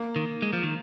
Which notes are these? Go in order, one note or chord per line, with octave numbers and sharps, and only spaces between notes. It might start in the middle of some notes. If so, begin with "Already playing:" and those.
Already playing: A#3
D#3
G#3
F3
D#3